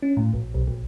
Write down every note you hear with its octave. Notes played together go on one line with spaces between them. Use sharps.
C#4
A2
A#1
B1
A#1